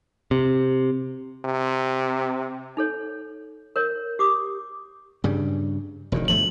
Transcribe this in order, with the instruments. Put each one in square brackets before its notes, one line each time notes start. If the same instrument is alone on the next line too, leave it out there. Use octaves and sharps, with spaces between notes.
[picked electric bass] C3
[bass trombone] C3
[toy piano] D#4 A4 C#5
A#4 C#5
G4 D6 D#6
[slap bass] G2 C#3 G3
E1 B2 D#3
[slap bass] G1 F3 A3 [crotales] F#7